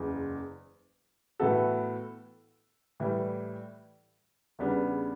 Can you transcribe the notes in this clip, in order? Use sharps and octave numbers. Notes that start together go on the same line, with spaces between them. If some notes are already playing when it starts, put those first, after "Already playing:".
Already playing: F#1 E2 C#3
A2 E3 B3 F#4 A4
A2 E3 G3
E2 C#3 G3 B3 D4